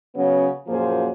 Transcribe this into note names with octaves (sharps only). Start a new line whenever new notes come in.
C#3 F#3 B3 C#4
F#2 A#2 F3 A#3 G#4 C5